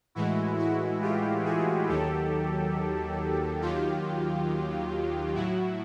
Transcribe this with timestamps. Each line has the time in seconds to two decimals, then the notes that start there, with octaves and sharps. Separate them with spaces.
0.15 A2 E3 G#3 E4 F#4
0.58 E4 F#4
1.02 F4 G4
1.45 F#4 G#4
1.88 D#2 D#3 F#3 G4 A4
3.61 D#2 D#3 F#3 F4 G4
5.34 A2 F#3 E4 F#4